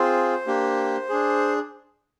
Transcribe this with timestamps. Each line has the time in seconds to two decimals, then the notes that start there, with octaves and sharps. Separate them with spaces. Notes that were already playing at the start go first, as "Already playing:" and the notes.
Already playing: C4 F4 G#4 C5
0.47 A#3 D4 G4
1.09 D4 G#4